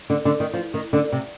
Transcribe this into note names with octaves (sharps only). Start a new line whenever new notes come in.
D3
D3
D#3
F3
D#3
D3
C3